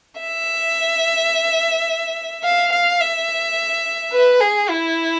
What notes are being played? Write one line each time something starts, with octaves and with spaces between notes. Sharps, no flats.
E5
F5
F5
E5
B4
G#4
E4